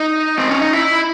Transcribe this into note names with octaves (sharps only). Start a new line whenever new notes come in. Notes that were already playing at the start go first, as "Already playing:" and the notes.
Already playing: D#4
C4
C#4
D#4
E4